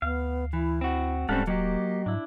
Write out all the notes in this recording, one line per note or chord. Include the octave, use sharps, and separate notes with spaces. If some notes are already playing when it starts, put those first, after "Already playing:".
D2 B3 F5
E3 E4
C4 F#4
D#1 G#2 G3 C4 C#4 A4 F5 F#5
F#3 A#3 G4 D#5
G#2 D4 E4